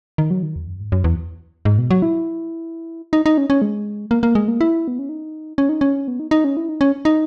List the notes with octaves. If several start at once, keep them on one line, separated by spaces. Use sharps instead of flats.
D#3
F#3
D#3
E2
F#2
G#2
F#2
E2
G#2
B2
F#3
E4
D#4
D#4
C#4
C#4
G#3
A#3
A#3
G#3
A#3
E4
B3
C#4
D#4
C#4
D#4
C#4
B3
D#4
D#4
C#4
E4
D#4
C#4
D#4